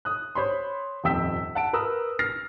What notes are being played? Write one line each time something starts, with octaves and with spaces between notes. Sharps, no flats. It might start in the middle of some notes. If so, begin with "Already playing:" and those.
D#6 F#6
C5 C#5 B5 C6
D#1 G#1 F2 G5 E6 B6
F#5 A5 D7
A#4 B4 A#5 D#6 E6
F6 A6 A#6 C7